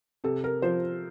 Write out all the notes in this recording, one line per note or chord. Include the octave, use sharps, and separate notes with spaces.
C3 A4
A#4
F3 C5